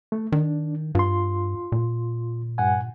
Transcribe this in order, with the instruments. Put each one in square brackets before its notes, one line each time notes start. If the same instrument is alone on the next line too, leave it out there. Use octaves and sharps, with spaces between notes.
[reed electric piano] A3
[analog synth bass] D#3 [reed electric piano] D4
[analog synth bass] G2 [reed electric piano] F4 C6
[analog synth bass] A#2
[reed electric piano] G2 F#5 G#5